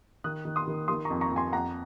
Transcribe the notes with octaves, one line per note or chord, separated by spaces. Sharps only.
D#3 D#6 F#6
D#3
C6 D#6
D#3
D#3 C6 D#6
A#5 C#6
F2
A#5 C#6
F2
G#5 C6
F2 F#5 A#5